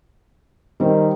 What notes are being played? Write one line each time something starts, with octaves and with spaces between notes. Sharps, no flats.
D#3 G3 C4